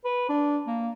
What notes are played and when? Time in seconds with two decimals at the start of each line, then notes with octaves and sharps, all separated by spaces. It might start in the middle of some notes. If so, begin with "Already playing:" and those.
0.04 B4
0.29 D4
0.67 A#3